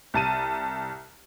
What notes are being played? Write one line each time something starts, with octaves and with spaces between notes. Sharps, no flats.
C2 A5 D#7